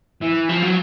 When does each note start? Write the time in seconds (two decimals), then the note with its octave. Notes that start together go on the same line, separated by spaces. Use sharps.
0.21 E3
0.49 F3
0.62 F#3